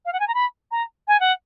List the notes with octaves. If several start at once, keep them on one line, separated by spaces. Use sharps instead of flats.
F5
F#5
G#5
A#5
B5
A#5
G#5
F#5